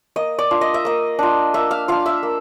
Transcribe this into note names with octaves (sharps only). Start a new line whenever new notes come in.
A#3 D#5
D5
D4 F4
D#5
E5
A#3 D#5
D4 F4
A#3 E5
F5
D4 F4 F5
E5
A#3